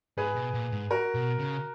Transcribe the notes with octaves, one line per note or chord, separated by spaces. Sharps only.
G#2 G#4 B4
B2
A#2
G#2
F#4 A#4
B2
C#3